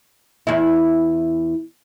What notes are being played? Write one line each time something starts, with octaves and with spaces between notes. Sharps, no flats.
E2 E4